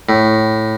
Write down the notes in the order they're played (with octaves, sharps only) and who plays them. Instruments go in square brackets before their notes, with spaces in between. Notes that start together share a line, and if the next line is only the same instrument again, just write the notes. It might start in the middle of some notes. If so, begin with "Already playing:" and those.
[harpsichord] A2